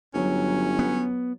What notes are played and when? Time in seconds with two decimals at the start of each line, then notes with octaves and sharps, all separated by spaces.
0.14 G1 F#3 C#4
0.79 B3